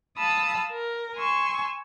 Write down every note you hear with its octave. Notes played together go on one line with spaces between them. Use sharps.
F5 A5 B5 D#6 E6
A#4
G#5 C6 C#6 E6